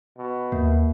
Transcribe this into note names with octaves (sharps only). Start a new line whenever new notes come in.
B2
D#2 A#3